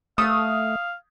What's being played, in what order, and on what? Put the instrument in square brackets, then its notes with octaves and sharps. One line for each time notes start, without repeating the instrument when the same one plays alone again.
[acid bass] A3 [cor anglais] F5 [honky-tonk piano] D#6